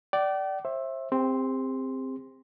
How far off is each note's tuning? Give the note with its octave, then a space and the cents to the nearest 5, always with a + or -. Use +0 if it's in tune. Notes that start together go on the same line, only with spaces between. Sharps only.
D5 +0 G5 -45
C5 +30 E5 +0
C4 +0 G4 +45 C6 +0